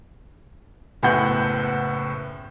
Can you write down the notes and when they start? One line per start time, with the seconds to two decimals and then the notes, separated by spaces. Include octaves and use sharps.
1.03 F#1 A2 B3 F#5 G6